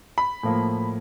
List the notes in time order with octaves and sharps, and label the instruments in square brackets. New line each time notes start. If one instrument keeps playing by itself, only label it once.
[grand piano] B5
A2 F3 A#3